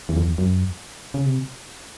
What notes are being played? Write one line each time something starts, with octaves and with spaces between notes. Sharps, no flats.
E2
F2
E2
F#2
C#3
C3